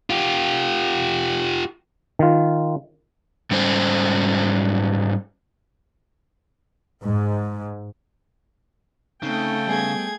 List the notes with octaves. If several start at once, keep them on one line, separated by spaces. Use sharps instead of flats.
F4 G4
D#3 F4
G#2 G3 C#4 C5
G#2
C#3 A3 C4 D#4 G5
G3 B3 G#4 G#6